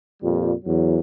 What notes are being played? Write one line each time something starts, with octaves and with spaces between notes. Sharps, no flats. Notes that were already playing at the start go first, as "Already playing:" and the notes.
F2 A#2 G3
E2 F#3